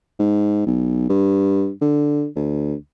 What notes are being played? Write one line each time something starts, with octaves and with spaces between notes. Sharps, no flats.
G#2
B1
G2
D3
D2